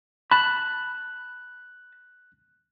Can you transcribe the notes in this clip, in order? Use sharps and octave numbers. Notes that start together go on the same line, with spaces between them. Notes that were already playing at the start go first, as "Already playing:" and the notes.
A5 B5 F#6